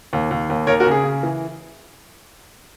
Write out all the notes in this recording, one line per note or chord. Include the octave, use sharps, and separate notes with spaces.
D#2
D#2
D#2
D#2 A#4 C#5
F#4 A#4
C#3
G#4
C#3
E3